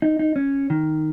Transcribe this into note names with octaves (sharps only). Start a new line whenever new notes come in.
D#4
D#4
C#4
D#3